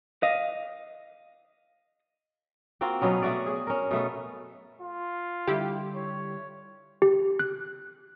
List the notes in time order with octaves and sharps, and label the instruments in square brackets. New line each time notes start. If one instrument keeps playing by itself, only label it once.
[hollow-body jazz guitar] D#5 F5
[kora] A#3 C4 F4 F#4
B2 F#3 B3 C#4
A3 F#4 D5
G#4
C#4 A#4
B2 A3 B3
[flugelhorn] F4
[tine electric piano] D3 G3 [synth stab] E4 G4
[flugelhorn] C#5
[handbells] G4
F#6